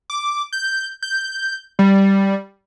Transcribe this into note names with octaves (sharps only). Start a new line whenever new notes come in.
D6
G6
G6
G3